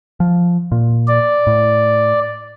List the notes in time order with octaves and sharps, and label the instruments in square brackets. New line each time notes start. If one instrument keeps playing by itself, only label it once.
[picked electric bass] F3
A#2
[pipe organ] D5
[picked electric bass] A2